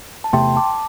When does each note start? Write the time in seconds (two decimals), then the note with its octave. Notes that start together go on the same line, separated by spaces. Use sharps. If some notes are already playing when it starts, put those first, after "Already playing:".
0.24 A5
0.33 E2 C3 A3 G5 C6
0.56 A5 D6